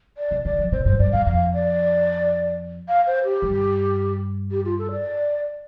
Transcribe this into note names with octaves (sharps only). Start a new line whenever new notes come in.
D5
C3
D3 D5
F3
C3 C5
G2 C5
G2 D5
G2 F5
F2 F5
D5
F5
C5
G4
G2
G4
F4
A4
D5